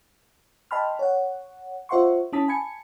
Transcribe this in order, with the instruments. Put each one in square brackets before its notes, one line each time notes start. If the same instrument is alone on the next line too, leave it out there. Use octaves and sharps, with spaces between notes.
[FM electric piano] D#5 G5 A5 B5 C6 F6
C#5 F#5
F4 C5 E5 F#5 C6 C#6
C#4 E4 A5 D#6 B6
G#5 A5 B5 G#6 C#7